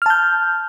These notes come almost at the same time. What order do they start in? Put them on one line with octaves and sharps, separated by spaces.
F6 A5 G6